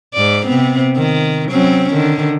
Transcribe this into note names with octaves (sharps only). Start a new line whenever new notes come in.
G#2 D5
C3 B3 C4
D#3
F#3 C4 C#4
D3 D#3